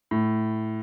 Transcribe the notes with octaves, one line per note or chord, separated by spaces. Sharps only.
A2